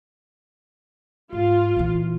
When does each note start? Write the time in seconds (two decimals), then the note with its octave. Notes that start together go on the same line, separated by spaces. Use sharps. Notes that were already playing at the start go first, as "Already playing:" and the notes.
1.33 G#2 F4
1.76 A#2 E3